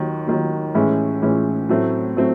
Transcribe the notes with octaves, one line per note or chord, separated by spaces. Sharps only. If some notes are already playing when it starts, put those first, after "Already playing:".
Already playing: D#2 D#3 F#3
D#2 D#3 F#3
A2 E3 G#3 C#4 E4
A2 E3 G#3 C#4 E4
A2 F#3 A3 C4
A2 F#3 A3 C4